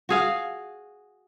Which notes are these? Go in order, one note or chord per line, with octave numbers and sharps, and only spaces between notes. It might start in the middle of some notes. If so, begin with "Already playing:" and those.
F#4 G#4 F5